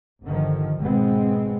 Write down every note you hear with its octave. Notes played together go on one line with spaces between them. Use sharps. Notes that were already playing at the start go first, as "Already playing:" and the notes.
G1 D3 D#3 F3
G#1 B2 G#3 B3 C4